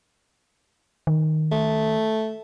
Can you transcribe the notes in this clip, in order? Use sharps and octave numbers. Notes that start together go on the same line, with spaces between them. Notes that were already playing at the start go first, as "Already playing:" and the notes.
D#3
A3